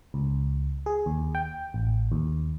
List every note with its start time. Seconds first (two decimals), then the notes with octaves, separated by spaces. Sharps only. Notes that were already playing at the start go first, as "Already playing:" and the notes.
0.14 C#2
0.86 G#4
1.06 D#2
1.35 G5
1.74 A1
2.12 D#2